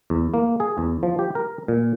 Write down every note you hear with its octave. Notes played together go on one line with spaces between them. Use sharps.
E2
A#3
G#4
E2
F3
G4
A#4
A#2